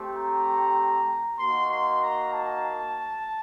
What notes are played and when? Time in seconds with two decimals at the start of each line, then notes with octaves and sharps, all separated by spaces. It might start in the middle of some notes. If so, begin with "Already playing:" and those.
Already playing: A3 C4 G4
0.14 A#5
1.39 A#3 D#4 F#4 C6
1.71 C6
2.02 A#5
2.34 A5